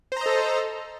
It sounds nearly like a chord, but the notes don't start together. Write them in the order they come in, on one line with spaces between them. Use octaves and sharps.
C5 A#5 D#5 A4